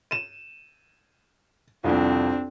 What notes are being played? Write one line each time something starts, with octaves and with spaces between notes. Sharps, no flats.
D#7 E7
C2 F2 C4 D4